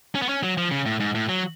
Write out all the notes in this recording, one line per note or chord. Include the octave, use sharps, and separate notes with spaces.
C#4
B3
C#4
F#3
F3
C#3
A2
G#2
A2
F#3